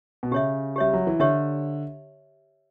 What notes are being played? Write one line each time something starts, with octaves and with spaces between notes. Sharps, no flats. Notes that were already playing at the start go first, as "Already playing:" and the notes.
B2
C#3 G4 C#5 E5
G3 G4 C#5 E5
F#3
E3
D3 G4 C#5 E5